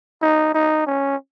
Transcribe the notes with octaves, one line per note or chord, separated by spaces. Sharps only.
D#4
D#4
C#4